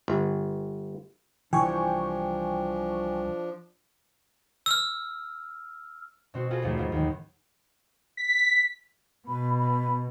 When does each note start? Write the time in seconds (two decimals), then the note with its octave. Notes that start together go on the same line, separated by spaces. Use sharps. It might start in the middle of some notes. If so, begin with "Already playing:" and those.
0.08 G1
1.53 C2 E3 F3 D4 G5 G#5 C#6
4.66 E6 F6
6.34 B2 C4 F#4
6.50 B3 F4 F#4 G#4 A4
6.62 D#2 G#2 F3 A3 B3
6.77 G#2 F3 F#3
6.92 D#2 D#3
8.17 B6
9.28 B2 B5
9.58 B5